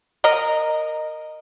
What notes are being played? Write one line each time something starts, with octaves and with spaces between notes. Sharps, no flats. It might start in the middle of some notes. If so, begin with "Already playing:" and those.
A#4 D#5